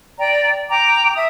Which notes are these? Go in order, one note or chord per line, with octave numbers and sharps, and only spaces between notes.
D5 G5 A#5
G5 A#5 D6
E5 D#6